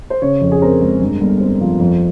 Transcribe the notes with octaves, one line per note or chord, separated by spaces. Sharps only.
C5
C#3 C#5
F2
G#4
C4 A#4
G#3
G2
G1
C4
F3
F2